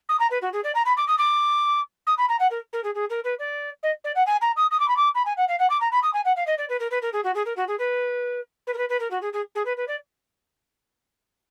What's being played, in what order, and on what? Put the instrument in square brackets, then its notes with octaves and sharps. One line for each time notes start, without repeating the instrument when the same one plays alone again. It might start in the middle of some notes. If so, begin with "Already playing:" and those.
[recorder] D#6
A#5
B4
F#4
G#4
D5
A#5
B5
D6
D#6
D6
D#6
B5
A#5
F#5
A#4
A#4
G#4
G#4
A#4
B4
D5
D#5
D5
F#5
G#5
A#5
D#6
D#6
D6
B5
D6
B5
G#5
F#5
F5
F#5
D6
A#5
B5
D#6
G#5
F#5
F5
D#5
D5
B4
A#4
B4
A#4
G#4
F#4
G#4
A#4
F#4
G#4
B4
B4
A#4
B4
B4
A#4
F#4
G#4
G#4
G#4
B4
B4
D5